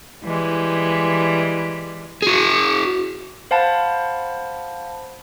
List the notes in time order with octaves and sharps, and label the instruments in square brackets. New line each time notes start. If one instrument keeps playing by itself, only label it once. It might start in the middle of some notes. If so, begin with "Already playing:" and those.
[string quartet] E3 G3 G#3
[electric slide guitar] F#4 G#4
[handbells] C5 F5 F#5 A5 B5 A6